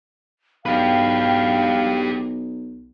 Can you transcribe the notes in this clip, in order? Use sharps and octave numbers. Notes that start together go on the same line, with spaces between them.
B1 G4 B4 F5 G5